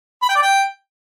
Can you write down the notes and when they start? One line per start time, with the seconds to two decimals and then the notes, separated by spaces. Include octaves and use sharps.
0.22 B5
0.29 G5
0.36 D5
0.42 G5